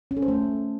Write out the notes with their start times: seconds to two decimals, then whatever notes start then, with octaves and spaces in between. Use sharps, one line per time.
0.11 C#4
0.17 A4
0.22 C5
0.28 A3